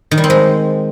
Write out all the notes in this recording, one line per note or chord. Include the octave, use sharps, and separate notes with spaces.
D#3
G3
C4
G#3